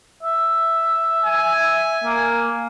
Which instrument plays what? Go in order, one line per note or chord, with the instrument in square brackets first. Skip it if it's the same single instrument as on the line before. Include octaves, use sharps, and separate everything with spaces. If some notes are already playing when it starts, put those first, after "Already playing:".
[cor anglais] E5
[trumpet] G#5
[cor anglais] A#3